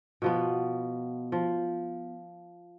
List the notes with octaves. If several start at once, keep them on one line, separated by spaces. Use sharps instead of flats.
B2 F3 B3
F3